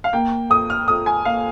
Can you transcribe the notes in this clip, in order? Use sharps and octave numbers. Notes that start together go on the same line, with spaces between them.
F5
A#3 G5
F2 D#6
F6
F2 D#6
G#5
A#3 F5